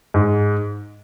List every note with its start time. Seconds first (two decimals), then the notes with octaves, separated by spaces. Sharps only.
0.14 G#2